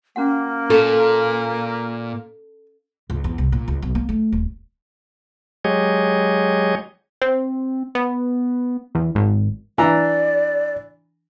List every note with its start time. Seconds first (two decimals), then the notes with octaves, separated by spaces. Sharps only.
0.16 A#3 C#4 F#4 F#5
0.70 A#2 A4 F5 A#5 C#6
3.10 C#2
3.24 E2
3.38 C2
3.52 A#2
3.68 C#2
3.82 B1
3.95 A#3
4.09 A3
4.32 D#1
5.65 F#3 G#3 G4 G#4 C#5 D#5
7.22 C4
7.95 B3
8.95 E2
9.15 G#1
9.78 E3 D4 D5 A#5